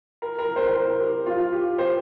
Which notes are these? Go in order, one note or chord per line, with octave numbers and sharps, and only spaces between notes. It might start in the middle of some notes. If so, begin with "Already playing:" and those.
A#4
A#4
C5
C5
A#4
G4
F4
G4
C5